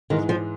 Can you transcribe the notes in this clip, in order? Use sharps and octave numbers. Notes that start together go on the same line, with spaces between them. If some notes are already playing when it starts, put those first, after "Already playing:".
G#2 D#3 E3 G#3
F3